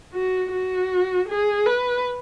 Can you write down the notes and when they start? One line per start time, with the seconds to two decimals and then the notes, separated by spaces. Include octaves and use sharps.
0.14 F#4
0.52 F#4
1.29 G#4
1.66 B4